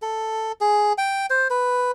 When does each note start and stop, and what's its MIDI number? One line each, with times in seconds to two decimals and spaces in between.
0.02 0.52 69
0.61 0.93 68
0.98 1.26 79
1.30 1.48 72
1.50 1.91 71